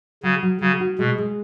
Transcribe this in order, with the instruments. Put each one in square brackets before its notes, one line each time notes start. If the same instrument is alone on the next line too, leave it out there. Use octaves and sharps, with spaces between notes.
[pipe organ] C#3 [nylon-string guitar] F#3
[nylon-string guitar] F#3
[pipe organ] C#3 [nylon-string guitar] F#3
[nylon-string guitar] F#4
[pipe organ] B2 [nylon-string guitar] G#3
[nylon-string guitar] G#3